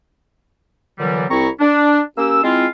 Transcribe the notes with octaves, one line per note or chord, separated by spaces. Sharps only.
A#2 D3 E3 F#3 G3
C2 C4 E4 A#5 C#6
D4
A#3 C#4 G4 E6
G#3 C4 E4 F4